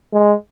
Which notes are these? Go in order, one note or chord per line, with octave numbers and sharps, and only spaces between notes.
G#3